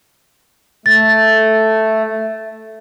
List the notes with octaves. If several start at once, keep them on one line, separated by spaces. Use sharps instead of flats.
A3 A6